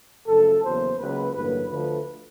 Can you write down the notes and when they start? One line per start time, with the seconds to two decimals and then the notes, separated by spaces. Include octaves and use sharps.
0.26 F#2 C#3 F3 A3 A4
0.61 E2 C#3 F#3 A#3 C5
0.97 C#2 C#3 F#3 A#3 B4
1.33 A1 G2 D3 F#3 A#3 B4
1.69 D2 D3 F3 A3 B4